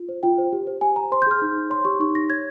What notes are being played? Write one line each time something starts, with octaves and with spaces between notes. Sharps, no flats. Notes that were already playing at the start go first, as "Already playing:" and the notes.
Already playing: F4
C5
F4 G5
C5
G4
C5
G4 G#5
C5 A#5
C5 C6
G6
G#4 F6
D#4
D#4
C#5 C6
G4 C#6
D#4 C#6
D#4 A#6
C#5 G#6